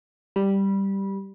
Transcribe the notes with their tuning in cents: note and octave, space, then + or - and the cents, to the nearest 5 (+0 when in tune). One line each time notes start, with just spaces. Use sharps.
G3 +0 B5 -20